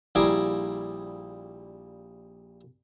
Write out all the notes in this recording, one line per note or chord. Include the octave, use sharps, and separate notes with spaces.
A#1 G3 E4 G#4 A#4 D6